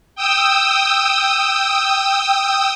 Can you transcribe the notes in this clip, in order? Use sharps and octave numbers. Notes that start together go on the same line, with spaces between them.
G5 D#6 E6